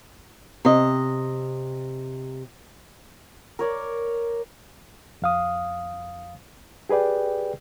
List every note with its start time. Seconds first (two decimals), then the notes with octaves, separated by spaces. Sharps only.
0.65 C3 D#5
3.59 A#4 C#5 D5
5.22 F2 F5 D#6
6.89 G4 G#4 B4 D5 G5